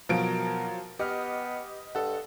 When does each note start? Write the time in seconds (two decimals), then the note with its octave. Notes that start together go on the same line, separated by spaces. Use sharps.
0.09 B2 F3 F#3 A#4 D7
0.99 B3 G4 D#5 F6
1.95 G2 A4 F#5